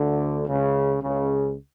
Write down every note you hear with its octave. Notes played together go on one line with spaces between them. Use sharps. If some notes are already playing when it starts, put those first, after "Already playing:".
Already playing: D2 D3
C#2 C#3
C#2 C#3